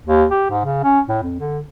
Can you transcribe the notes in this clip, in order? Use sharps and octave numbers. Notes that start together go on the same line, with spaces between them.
D#2
G4
G#2
C#3
C#4
A2
F2
D3